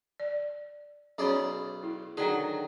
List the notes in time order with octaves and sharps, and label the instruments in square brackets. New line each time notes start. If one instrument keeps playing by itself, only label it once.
[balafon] D5
[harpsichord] B1 G#4 D5 [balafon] C#4 C#5 B5
[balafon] E4
[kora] D3 D#3 F#3 [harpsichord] G#4